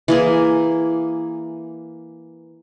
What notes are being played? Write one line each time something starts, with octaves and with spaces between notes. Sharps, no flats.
E3 A#3 G#4